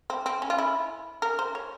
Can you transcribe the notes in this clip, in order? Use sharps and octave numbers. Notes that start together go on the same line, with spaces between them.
C4
C4
C#4
F4
E4
A#4
C5
C#5